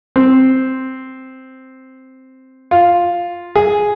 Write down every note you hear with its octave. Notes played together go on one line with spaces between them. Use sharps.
C4
F4
G#4